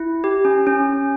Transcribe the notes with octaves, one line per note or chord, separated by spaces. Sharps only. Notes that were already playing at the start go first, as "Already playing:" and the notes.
Already playing: E4
G4
C#4
C#4